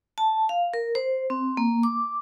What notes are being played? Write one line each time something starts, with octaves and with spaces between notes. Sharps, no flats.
A5
F5
A#4
C5
C4
A#3
D6